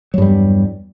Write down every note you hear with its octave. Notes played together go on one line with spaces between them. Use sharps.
E2 G2 F#3 G3